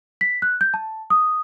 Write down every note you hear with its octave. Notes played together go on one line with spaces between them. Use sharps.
B6
F#6
G6
A5
D#6